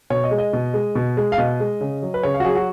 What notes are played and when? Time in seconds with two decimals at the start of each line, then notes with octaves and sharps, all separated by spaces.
0.10 B2 C#5
0.24 D#5
0.31 G#3
0.38 D#5
0.53 B2
0.74 G#3
0.95 B2
1.17 G#3
1.32 F5
1.38 B2 D#5
1.60 G#3
1.81 C#3
2.02 F#3
2.14 B4
2.23 C#3 C#5
2.34 F5
2.40 F#4
2.44 F#3 G#4
2.55 F#4